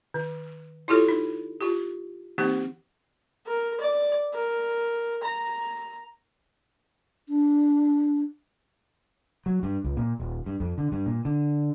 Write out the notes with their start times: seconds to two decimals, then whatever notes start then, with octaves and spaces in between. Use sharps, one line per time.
0.14 D#3
0.88 E4 F4 G4 A4 C#5
1.09 D#4
1.61 F4 G4
2.38 E3 A#3 C4 D#4 G4
3.47 A#4
3.81 D5
4.34 A#4
5.23 A#5
7.29 D4
9.46 F#3
9.63 G2
9.84 C#2
9.97 A#2
10.20 D#1
10.46 G2
10.60 F2
10.78 D3
10.92 G2
11.06 A#2
11.25 D3